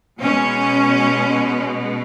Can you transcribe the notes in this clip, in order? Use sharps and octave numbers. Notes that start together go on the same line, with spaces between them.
B2 G#3 C#4